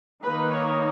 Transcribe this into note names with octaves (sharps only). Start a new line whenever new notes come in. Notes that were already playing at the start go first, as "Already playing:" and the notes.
D#3 A#3 D#4 B4
C#5